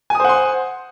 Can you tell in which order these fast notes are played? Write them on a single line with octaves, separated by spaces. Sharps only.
G#5 D#6 C5 F#5 C6